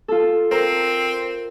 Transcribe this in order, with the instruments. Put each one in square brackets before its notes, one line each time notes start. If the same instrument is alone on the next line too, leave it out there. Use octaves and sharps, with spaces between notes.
[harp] F4 A4
[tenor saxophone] C4 [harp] A#4